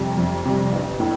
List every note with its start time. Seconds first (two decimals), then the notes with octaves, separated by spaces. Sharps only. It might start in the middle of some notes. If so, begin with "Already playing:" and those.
Already playing: F2 C3 G3
0.17 F2
0.45 C3 G3
0.73 A1
1.00 A2